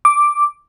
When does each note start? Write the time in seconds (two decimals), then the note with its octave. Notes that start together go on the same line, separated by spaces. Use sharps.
0.05 D6